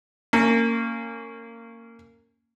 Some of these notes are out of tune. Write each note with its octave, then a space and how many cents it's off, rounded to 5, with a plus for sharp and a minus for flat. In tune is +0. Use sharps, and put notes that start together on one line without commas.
A#3 -25 C#4 +0